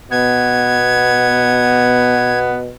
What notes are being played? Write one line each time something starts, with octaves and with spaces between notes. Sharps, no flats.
B2 B3 G#6